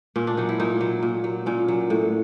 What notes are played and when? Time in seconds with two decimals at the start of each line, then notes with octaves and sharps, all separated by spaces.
0.16 A#2 C#4
0.27 D4
0.37 F#3 D#4
0.49 E4
0.60 A#2 D#4
0.81 F#3
1.03 A#2
1.24 F#3
1.46 A#2 C#4
1.68 F#3
1.90 A2